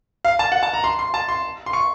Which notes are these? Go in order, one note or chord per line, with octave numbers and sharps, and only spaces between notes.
F5
A5
F#5
A5
A#5
C6
C6
A5
C6
C6
C#6